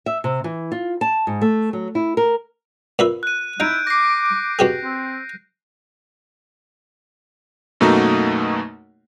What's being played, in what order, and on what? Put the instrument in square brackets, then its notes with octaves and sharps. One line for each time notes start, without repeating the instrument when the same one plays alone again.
[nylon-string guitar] E5
C3
E3
F4
A5
G#2
A3
F#3
E4
A#4
[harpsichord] A#2 B4 E5
[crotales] F#6 D#7
[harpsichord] D#4 [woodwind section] E4 [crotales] G6 D7
[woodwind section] D6 [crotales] A#6 C7
[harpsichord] B2 G4 G#4
[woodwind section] C4
[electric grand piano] F#2 B2 A3 A#3 D#4 F#4